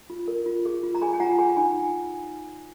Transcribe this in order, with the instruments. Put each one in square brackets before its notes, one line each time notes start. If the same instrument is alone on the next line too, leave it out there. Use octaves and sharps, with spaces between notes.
[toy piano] F4
A#4
F4
G#4
F4
A#5
G#4 G#5 B5
G#5
F4 F#5 A#5
G#4 G#5 B5
D#4 G#5 B5